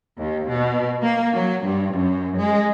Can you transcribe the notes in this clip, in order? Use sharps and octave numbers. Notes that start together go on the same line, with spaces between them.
D#2
B2
A#3
F#3
G2
F#2
G#3